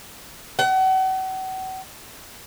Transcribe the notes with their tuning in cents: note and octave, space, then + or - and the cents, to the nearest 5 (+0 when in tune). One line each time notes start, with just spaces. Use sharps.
F#5 +35